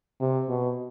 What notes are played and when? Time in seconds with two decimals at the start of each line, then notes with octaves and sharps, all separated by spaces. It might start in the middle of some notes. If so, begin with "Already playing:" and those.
0.21 C3
0.49 B2